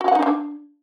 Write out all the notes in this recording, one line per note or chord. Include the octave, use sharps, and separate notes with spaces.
F#4
F#5
D#4
D4